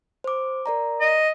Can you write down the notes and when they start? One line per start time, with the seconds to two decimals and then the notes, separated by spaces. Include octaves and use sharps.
0.24 C5 D6
0.66 A#4 D5 A#5
1.00 D#5